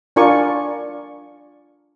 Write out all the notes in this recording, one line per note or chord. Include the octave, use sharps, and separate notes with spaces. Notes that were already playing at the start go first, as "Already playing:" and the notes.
D4 F4 A#4 D5 G#5 C#6